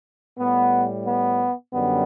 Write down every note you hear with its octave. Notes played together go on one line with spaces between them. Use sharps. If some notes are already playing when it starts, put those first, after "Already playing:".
A2 G3 B3
B3
F#2 D3 G3 B3